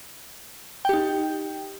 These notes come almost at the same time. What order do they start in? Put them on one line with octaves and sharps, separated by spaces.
G5 G4 D#4